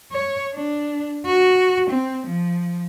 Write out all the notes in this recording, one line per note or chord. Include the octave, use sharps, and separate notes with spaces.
C#5
D4
F#4
C4
F3